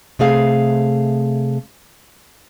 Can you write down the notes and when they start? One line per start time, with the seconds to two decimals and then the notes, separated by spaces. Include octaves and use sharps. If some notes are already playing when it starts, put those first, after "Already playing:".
0.19 C3 A3 G#4 F5